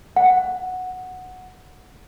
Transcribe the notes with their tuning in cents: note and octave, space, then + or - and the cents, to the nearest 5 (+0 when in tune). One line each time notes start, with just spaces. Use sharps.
F#5 -5